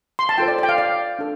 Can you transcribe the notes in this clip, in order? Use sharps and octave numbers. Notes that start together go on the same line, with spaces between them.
C6
A5
F4 A4 C5 G5
D5
D5
G5
F5
D5
D4 A4